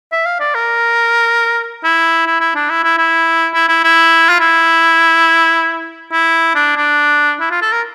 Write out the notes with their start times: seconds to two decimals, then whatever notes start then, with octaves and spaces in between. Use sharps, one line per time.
0.12 E5
0.26 F5
0.40 D5
0.55 A#4
1.83 E4
2.26 E4
2.40 E4
2.55 D4
2.70 E4
2.84 E4
2.97 E4
3.54 E4
3.68 E4
3.84 E4
4.29 F4
4.40 E4
6.12 E4
6.55 D4
6.77 D4
7.40 E4
7.51 F4
7.62 A4
7.72 A#4